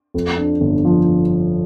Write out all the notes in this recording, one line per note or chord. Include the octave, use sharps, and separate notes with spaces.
F2
D4
G1
F3